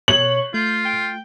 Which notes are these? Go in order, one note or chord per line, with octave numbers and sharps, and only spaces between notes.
B2 C#5 F#7
A3 F4 G6
G5